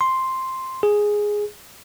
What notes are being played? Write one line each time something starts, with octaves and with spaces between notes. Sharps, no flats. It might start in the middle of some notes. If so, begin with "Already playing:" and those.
C6
G#4